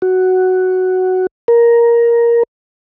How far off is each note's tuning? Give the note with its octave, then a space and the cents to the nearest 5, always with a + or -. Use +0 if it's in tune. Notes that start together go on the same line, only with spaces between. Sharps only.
F#4 +5
A#4 +10